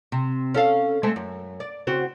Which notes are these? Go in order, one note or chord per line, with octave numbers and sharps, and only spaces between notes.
C3
C#4 A4 F5
G#3 A3 C4
F#2
D5
C#3 C4 F#4